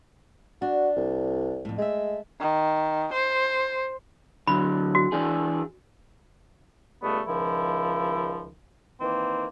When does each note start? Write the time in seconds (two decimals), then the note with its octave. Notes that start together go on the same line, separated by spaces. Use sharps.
0.62 D4 F#4
0.96 C2
1.65 F2 A2
1.78 G#3 A3 E5
2.41 D#3
3.13 C5
4.47 D3 F#3 B5
4.95 F#4
5.12 E3 D4 G#4
7.03 C#2 G3 A3 B3
7.27 C#2 D#3 F3 E4
9.01 D#3 E3 A#3 C4